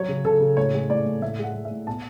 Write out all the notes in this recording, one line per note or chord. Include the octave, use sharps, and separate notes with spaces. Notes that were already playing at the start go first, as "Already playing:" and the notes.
Already playing: F#3 C#5
C#3
C#3 A4
C#3
A2 C#5
G#3
A2 D5
A2
A2 E5
G#3
F#5
G#3
E5
A2
B2 A5